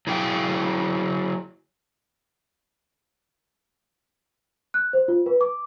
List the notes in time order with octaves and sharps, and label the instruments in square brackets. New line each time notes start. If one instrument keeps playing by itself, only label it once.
[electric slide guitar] F#3 E4 G#4 G5
[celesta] F#6
C5
F4
B4
D6